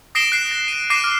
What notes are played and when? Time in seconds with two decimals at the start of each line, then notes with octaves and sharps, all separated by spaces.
0.15 D#6 A#6 C7 D7 E7 G7
0.32 F#6 C7 E7
0.51 A#6
0.68 D#7
0.90 D6 F#6 A#6 C7 D#7 E7
1.04 F6